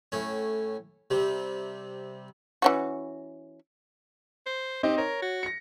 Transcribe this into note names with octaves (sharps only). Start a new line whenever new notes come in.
A2 C#4
C3 G3
E3 C#4 F#4
C5
C4 D#4 G4 D#5
A#4 C#5
F#4
A#6 C#7